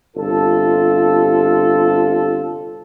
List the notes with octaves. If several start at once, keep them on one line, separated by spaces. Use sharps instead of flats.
G1 C3 F4 A4